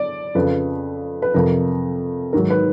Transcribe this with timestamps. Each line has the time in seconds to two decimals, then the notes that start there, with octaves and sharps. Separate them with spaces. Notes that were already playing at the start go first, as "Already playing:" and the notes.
Already playing: D5
0.35 F2 C#3 F3 B4
1.22 B4
1.34 F2 C3 F3 A#4
2.33 G#2 D#3 F#3 A#4
2.50 B4